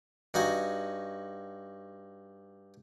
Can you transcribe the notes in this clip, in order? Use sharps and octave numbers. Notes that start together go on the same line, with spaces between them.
G2 D#4 F#4 G#5